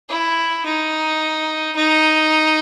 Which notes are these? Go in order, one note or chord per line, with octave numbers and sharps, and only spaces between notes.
E4
D#4
D#4